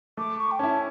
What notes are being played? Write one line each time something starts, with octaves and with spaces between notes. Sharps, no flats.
A3 D6
C#6
G5
C#4 E4 A5